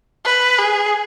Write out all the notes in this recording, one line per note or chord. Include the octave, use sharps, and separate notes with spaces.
B4
G#4